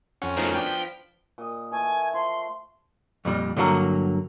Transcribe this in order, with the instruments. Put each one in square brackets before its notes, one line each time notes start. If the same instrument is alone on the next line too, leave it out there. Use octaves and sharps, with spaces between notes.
[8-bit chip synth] F2 C#4 [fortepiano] F#5
[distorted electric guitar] D#3 A3 [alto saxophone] F3 [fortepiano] D#4 F#4 A#4
[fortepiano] B3 D4 [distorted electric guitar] G5
[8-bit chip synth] B6
[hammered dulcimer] A#2 D#5
[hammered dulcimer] E3 A3 [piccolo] G#5
[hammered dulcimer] F3 [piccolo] C6
[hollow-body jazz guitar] F2 A#2 G3
G2 D3 F#3 A#3 A#5